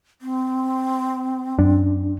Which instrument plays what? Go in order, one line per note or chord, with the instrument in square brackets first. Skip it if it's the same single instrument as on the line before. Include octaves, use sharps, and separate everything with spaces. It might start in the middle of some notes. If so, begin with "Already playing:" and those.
[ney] C4
[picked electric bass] F#2 [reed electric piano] D4